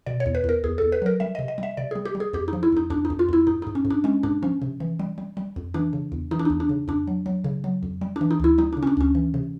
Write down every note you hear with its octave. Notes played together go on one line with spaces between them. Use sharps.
B2 D5
C#5
E2
B4
E2 A#4
E2 G#4
E2 A4
B4
F#3 A#4
G3 E5
C3 D#5
D#5
G3 E5
C3 D5
G3 G#4
G4
G3
G#4
F2 G4
D#4
F3
E4
F2 D#4
F2 D4
D#4
F2
F4
F2 E4
G#2 D#4
G#2 D#4
C#4
G#2
D4
G#3 C#4
G#2 D4
F3 C#4
C3
E3
G3
G3
G3
F2
E3 D4
C#3
E2
E3 D#4
D4
E2 D#4
D4
C#3
F2 D4
F#3
F#3
C#3
F#3
F2
G3
D4
E3
D#4
D2 E4
G3 D#4
C#3 D4
C#4
D4
D2 C#4
E3
C3